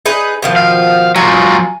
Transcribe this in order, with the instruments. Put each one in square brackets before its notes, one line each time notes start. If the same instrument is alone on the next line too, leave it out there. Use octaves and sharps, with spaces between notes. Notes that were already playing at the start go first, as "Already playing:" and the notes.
[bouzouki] D#4 G#4 B4
B2 D#3 F3
[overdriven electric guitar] F5
[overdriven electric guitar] F#3 F4 [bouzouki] G#5